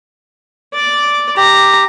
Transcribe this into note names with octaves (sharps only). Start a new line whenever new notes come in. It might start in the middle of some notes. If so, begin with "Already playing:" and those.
D5 D6
G4 A#5